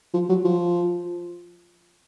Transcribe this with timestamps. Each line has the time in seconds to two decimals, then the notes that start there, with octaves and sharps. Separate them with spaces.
0.14 F3
0.29 F#3
0.45 F3